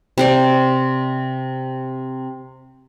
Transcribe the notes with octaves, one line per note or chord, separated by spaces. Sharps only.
C3 C5 D5